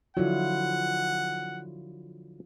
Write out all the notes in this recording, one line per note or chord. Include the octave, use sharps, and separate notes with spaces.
D3 F3 F#3 E4 F4 F#5